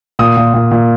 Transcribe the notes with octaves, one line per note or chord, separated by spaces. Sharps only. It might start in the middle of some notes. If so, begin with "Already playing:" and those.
A#2 D#6
A#2
A#2
A#2